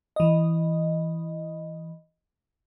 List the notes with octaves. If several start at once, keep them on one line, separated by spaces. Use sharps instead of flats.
E3 D#5